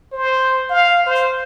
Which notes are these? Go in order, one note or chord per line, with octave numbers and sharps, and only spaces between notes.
C5
F5
C5